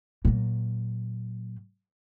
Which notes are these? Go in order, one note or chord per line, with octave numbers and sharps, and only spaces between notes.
A#2 F#3